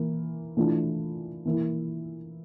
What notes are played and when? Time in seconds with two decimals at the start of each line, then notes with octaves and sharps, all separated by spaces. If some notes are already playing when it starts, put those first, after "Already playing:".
Already playing: E3 A#3
0.57 E3 A3 D4 F4
1.45 E3 A#3 E4